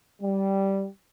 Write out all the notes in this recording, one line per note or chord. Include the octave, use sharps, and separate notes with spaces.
G3